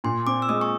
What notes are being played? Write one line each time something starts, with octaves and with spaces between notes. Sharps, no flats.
A#2 C6
C4 D6
E6
G#3 D#6
C#6